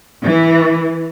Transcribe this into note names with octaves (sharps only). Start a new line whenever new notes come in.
E3